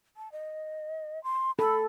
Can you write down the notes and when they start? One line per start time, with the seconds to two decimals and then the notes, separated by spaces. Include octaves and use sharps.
0.17 A5
0.32 D#5
1.24 C6
1.59 A4 B5